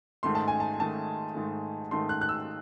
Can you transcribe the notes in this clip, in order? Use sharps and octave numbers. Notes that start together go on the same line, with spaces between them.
G#2 D#3 A3 C6
A5
G#5
A5
G#2 D#3 A3 A5
G#2 D#3 A3
G#2 D#3 A3 C6
F#6
F#6
E6